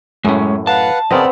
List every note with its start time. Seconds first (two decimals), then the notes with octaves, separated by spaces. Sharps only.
0.25 F#2 A2 G#3 C#4
0.67 B4 F5 F#5 A5
1.11 C#3 B3 C4 A#4 D5 D#5